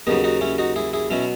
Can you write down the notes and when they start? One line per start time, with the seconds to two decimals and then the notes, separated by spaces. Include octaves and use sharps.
0.07 D#2 C#3 F#3 B3 D#4
0.24 D#4 F#4
0.41 C#4 E4
0.58 D#4 F#4
0.76 E4 G#4
0.93 E4 G#4
1.10 B2 F#3 C#4 E4